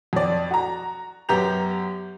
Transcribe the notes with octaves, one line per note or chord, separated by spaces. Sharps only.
F2 D5
F#4 A#5
F#2 B3 G4 A#5 G6 F7